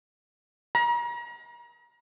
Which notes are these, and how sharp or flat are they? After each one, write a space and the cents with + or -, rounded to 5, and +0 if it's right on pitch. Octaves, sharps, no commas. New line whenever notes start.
A#5 +40